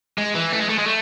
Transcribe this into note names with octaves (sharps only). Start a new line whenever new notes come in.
G#3
E3
A3
G#3
A3
G#3
A3